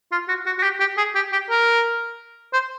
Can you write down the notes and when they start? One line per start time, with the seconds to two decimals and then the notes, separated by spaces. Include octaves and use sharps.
0.12 F4
0.28 F#4
0.46 F#4
0.58 F#4
0.63 G4
0.80 G4
0.97 G#4
1.15 G4
1.32 G4
1.49 A#4
2.53 C5